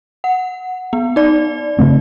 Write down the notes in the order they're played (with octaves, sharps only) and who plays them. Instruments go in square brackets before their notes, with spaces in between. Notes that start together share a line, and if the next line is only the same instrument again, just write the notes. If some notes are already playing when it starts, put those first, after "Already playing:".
[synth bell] F#5
B3
D#4 D5
[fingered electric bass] C#3 A3 C4